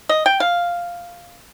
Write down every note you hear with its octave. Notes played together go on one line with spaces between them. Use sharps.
D#5
G5
F5